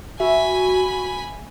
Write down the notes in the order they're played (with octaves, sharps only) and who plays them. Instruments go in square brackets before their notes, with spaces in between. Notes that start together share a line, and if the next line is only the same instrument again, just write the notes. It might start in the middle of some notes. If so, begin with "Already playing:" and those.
[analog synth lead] F#4 [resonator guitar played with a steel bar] E5 [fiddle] G#5 B5